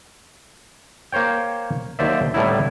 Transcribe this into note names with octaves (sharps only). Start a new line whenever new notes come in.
A#3 C5 C#5 G5
D#2 F#3 C5 D5 E5
A2 D3 G3 B3 D#4 E4